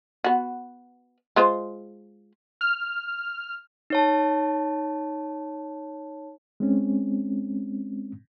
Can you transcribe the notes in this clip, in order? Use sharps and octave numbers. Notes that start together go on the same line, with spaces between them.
B3 F#4
G#3 F4 C5
F6
D#4 C#5 A5
G#3 C4 C#4